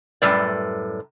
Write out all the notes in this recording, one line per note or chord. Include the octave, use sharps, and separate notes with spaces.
F#2 A2 G3 B4 D5